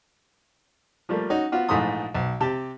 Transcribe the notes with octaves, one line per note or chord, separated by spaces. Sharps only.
F3 G3 A3 A#3
C#4 D#4 F#4
B3 F4 F#4
A#1 G#2 E3 A3 C6 D#6
B1
C3 G4 A5